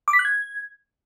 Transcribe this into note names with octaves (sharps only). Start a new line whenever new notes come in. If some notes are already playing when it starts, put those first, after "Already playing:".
D6
B6
F#6
G#6